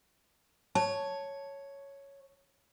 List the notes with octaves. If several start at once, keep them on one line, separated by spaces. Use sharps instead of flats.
C#5 A5